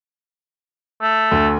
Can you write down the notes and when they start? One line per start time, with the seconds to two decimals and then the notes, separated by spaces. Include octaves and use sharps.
1.01 A3
1.31 D2